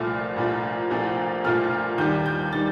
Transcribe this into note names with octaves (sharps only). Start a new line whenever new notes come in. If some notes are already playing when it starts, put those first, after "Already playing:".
Already playing: C2 A#2 F3 A3 F6
C2 A#2 F3 A3
C2 A#2 F3 A3
C2 A#2 F3 A3 F6
D#2 D#3 G3 G6
G6
D#3 G3 A6